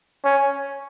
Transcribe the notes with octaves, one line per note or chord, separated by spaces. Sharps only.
C#4